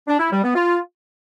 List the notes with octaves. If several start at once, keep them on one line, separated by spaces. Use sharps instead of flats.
D4
E4
G3
B3
F4